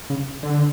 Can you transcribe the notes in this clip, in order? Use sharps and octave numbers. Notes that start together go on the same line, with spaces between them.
C#3
D3